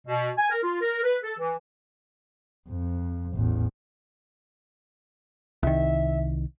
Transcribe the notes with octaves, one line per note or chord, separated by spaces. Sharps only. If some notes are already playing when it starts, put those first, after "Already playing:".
B2
G#5
A#4
F4
A#4
B4
A4
E3
F2
A1 E2
C2 D#3 E5